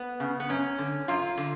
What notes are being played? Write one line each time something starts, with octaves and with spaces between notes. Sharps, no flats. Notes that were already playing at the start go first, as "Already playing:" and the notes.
Already playing: B3
C#3
B3
F#2 C#4
D3
F#2 F4
D3